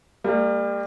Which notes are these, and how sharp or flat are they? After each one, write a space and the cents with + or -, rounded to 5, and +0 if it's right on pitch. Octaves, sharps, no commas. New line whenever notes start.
G3 +30 A#3 -30